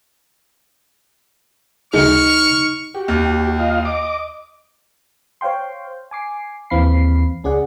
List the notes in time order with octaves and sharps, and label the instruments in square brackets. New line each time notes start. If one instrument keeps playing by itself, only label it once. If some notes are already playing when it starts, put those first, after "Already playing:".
[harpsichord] D2 G#3 [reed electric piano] D#4 [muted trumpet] C#6 [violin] F6
[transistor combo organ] F#4 G4
[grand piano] D#2
[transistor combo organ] F4 D#5 F5
D#5 D6
[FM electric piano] C5 C#5 F5 G5 C6
G#5 D6 C7
D#2 E3 C4 F5 B5 C7
C#2 C#4 G#4 D5 F#5